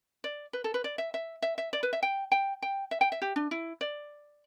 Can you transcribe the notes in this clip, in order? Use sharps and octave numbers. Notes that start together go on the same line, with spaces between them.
D5
B4
A4
B4
D5
E5
E5
E5
E5
D5
B4
E5
G5
G5
G5
E5
G5
E5
G4
D4
E4
D5